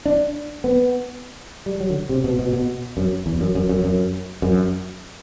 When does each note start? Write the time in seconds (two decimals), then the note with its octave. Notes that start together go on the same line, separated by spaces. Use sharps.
0.06 D4
0.64 B3
1.66 G3
1.80 F#3
1.90 D3
2.09 C3
2.24 B2
2.39 B2
2.53 B2
2.97 F#2
3.26 E2
3.41 F#2
3.55 F#2
3.69 F#2
3.84 F#2
4.42 F#2